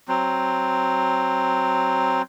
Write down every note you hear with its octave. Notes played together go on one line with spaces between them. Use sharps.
F#3 C4